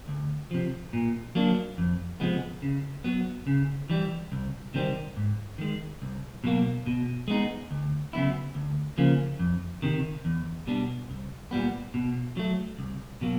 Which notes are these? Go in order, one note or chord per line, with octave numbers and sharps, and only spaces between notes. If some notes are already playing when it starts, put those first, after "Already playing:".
D2
C3 F3
A#2
F#3 A#3 D4
F2
C3 F3 G#3 B3
C#3
F#3 B3
C#3
E3 G3
C2
C3 D#3 G3 C4
G#2
D#3 G#3
C2
B2 F#3 A#3
B2
G#3 B3 D#4
D2
C#3 F#3 B3 E4
D2
C#3 F3 A#3
F2
C3 D#3
E2
B2 G3 B3 D4
C2
A#2 G3 B3
B2
F#3 A3
C2
B2 F#3 A#3